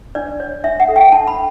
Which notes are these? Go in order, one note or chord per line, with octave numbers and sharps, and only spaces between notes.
D4 D5
C#5
D4 E5
F#5
A4
G5
D4 A5
B5